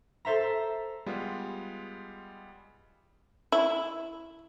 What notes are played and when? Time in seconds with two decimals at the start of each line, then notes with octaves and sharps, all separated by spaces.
0.25 A4 C5 E5 A#5
1.06 G3 G#3 B3 F4
3.52 E4